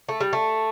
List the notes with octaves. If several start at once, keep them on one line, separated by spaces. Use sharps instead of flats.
A3
G3
A3